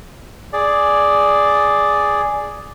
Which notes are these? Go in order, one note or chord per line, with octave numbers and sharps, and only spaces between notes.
G#4 D5